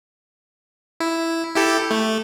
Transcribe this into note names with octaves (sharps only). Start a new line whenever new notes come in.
E4
E4 G4 A4
A3